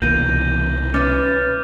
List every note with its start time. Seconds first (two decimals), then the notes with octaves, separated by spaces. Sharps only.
0.02 C2 B2 D#3 E3 A#3 G6 A#6 D#7
0.94 C#4 B4 C#5 E5 D6 F6 A6